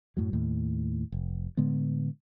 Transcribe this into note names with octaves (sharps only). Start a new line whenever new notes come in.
F#2 A2 F#3
D#2 A2
F1
A2 D3 G#3 B3